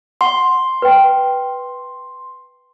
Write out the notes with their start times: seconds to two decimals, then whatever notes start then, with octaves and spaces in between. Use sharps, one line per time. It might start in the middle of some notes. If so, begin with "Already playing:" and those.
0.21 F#5 C6
0.82 B4 G5